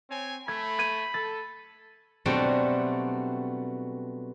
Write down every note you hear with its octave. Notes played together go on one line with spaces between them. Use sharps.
C4 C#5 G#5
A3 B5 G#6
G6 G#6 D#7
A4 A6
B2 F#3 G3 A3 C4 D4